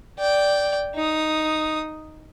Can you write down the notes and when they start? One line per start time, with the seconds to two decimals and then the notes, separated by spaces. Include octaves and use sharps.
0.18 D5 G5
0.95 D#4 D#6